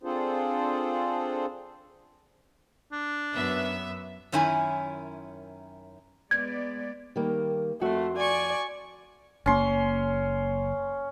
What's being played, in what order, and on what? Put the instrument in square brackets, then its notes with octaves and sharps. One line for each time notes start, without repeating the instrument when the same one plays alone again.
[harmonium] C4 D4 F4 G#4 A4 C5
[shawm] D4
[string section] F#2 B3 E5
[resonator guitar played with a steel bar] F#2 D#3 C#4 E4 G#5
[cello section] G#3 B3 D5 [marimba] G#6
[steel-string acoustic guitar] D#3 G3 A#3
[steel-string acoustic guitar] F2 [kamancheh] A3 [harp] F#4 C6
[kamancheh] D5 [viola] G#5 C#6
[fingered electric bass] F#1 A#3 [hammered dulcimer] C#4 C6